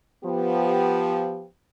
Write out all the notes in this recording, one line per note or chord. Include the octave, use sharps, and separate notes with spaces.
F3 B3 G4